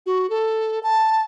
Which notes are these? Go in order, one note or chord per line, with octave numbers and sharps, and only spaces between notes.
F#4
A4
A5